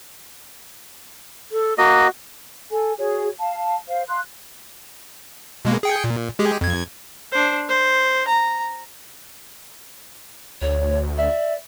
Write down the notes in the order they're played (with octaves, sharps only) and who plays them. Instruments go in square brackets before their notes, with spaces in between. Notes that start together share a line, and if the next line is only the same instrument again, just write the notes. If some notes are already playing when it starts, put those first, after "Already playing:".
[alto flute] A4
[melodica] A#3 D#5 [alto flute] F#4
[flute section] A4 G#5
F#4 G#4 C#5
F5 A5
C5 F5
F5 C6 F#6
[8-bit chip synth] B2 G#3 A#3
G#4 G5 C#7
A#2
G#3 G4 G#4
F2 G#6
[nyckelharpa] D4 C5
C5
A#5
[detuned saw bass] D2 [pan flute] C#5
[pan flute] D5 [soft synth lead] E5